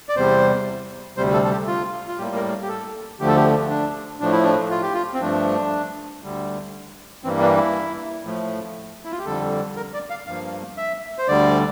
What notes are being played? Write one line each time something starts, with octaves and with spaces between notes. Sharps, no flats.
D5
E2 C3 G3 C5
D2 C3 G3 C5
A4
A4
G4
F4
F4
A2 G3 A#3 G4
A#4
G4
A4
D2 D3 F3 A3 G4
A4
G4
D4
A2 F3 A3 D4
E4
D4
F4
G4
F4
C4
G2 F3 A3 D4
D2 D3 G3
G2 E3 G3 A#3 C4
D4
E4
A2 F3 A3
E4
F4
G4
F2 D3 G3 A4
A#4
D5
F5
G2 F3 A#3 F5
E5
C5
D2 D3 G3 D5